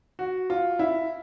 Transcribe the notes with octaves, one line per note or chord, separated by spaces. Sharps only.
F#4
F4
E4